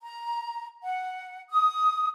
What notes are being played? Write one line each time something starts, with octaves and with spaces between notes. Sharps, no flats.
A#5
F#5
D#6